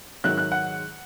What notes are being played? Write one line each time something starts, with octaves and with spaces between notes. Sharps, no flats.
G#2 D#3 F#3 F#6
F#6
F#5